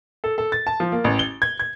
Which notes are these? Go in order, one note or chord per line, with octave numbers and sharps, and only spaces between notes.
A4
A4
A6
A5
F3
A#3
A1
G7
G#6
G#6